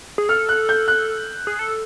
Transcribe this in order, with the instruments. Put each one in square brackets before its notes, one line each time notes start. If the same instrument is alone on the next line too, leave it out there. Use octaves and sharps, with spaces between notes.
[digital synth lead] G#4
[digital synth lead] A4 [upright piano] F6
[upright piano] F#6
G6
F#6
[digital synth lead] G#4
A4